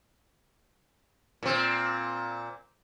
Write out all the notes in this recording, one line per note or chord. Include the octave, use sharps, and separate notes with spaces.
A#2 C4